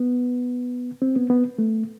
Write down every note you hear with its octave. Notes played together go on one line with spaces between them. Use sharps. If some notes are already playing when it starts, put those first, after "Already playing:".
Already playing: B3
C4
B3
B3
A3